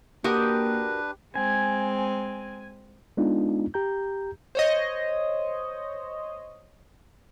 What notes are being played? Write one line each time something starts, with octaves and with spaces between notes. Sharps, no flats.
A#3 D4 F#4 G4 A#4 B4 D#6
G#3 C4 G#5
G#3 B3 D4 D#4 F4
G4 A#5 G6
C5 C#5 D#5